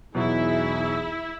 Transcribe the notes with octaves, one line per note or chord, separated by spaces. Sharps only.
E2 B2 E3 F#3 D#4 E4 G#4